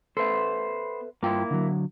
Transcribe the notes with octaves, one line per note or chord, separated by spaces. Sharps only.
B3 A4 B4 C5 E5
G2 A#3 E4 F4 G5
D3 F#3